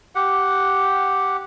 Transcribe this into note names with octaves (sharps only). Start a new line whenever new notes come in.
G4 F#5